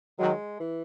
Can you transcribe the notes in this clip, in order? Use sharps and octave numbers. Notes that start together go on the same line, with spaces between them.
D#3 F#3 G#3
E3